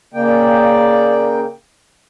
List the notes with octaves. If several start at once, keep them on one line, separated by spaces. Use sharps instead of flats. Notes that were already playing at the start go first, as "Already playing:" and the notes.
C#3 A#3 D5 G5